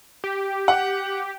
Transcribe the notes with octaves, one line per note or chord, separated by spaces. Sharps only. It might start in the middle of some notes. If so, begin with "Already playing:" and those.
G4
F#5